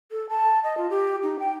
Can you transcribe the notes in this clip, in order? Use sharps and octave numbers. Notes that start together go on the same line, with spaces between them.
A4
A5
D#5
F4
G4
D#4
G5